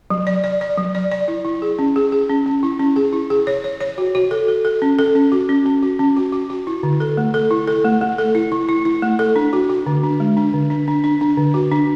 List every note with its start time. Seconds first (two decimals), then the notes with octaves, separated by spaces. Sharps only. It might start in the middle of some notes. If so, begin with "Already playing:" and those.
0.10 F#3
0.27 D5
0.44 D5
0.61 D5
0.78 F#3
0.95 D5
1.11 D5
1.28 E4
1.45 E4
1.62 G#4
1.79 C#4
1.96 G#4
2.12 G#4
2.29 C#4
2.46 C#4
2.63 E4
2.79 C#4
2.96 G#4
3.13 E4
3.30 G#4
3.47 C#5
3.64 C#5
3.81 C#5
3.98 F#4
4.15 F#4
4.31 A4
4.48 A4
4.65 A4
4.82 C#4
4.99 A4
5.15 C#4
5.32 F#4
5.49 C#4
5.66 C#4
5.83 F#4
5.99 C#4
6.16 F#4
6.33 F#4
6.50 F#4
6.67 E4
6.83 D3
7.00 A4
7.17 A3
7.34 A4
7.51 E4
7.67 A4
7.85 A3
8.01 A3
8.18 A4
8.35 E4
8.52 E4
8.69 E4
8.85 E4
9.02 A3
9.19 A4
9.36 D4
9.53 F#4
9.70 F#4
9.86 D3
10.03 D4
10.20 G#3
10.37 D4
10.54 D3
10.70 D4
10.88 D4
11.04 D4
11.21 D4
11.37 D3
11.54 F#4
11.72 D4